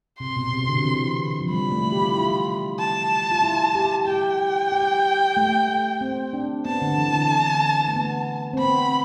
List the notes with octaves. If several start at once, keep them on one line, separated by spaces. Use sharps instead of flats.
C3 C6
B2
C3
C3
D3
E3
F3
G3 B5
A3
G4
F4
E4
F4
A5
F4
E4
G4
G4 G5
G4
A3
A3
C4
D4
B3 A5
D3
E3
D3
A3
B3
C4
B3 B5